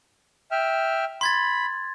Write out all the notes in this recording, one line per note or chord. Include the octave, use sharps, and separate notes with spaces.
E5 G5 F6
B5 C6 G#6 A6